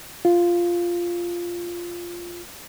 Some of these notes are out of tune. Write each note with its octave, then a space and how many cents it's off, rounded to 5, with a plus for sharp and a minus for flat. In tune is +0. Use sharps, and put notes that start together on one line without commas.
F4 -5